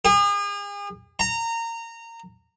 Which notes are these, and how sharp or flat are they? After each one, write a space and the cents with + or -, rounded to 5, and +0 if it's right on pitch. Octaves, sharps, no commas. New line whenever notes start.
G#4 -40
A#5 -20